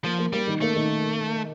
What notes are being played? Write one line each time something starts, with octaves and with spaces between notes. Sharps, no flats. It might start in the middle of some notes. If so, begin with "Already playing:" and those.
F3 A#3
A#3
G3 A#3
D#3
A3 A#3
D#3